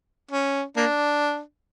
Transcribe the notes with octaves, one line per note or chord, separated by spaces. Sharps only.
C#4
A#3 D4